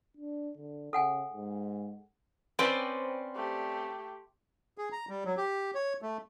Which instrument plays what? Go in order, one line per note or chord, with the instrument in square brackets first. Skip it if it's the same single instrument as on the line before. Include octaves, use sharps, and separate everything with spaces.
[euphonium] D4
D3
[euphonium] C#3 [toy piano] A4 F#5 G#5
[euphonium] G#2
[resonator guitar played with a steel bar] C4 C#4 B4 [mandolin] C5 D5 G5 [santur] C6
[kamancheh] A3 G4
[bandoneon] G#4
A#5
G3
F#3
G4
C#5
A3